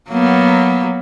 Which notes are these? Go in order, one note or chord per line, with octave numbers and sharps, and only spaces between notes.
F#3 A#3 B3